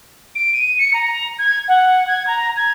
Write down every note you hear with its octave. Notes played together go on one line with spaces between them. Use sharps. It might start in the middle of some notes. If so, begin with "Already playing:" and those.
D7
D#7
C#7
A#5
G#6
F#5
G#6
A#5
G#6